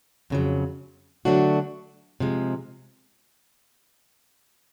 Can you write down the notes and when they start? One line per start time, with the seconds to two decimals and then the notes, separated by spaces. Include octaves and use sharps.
0.30 F2 C#3 F#3
1.25 D3 F#3 A3 D4 F#4
2.20 C3 F3 G#3